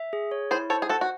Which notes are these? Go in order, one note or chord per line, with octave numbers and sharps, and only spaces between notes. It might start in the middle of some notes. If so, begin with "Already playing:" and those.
Already playing: E5
G#4
C#5
E4 G#4 C5
A4 C5 C#5
G#4
F#4 A4 F#5
F#4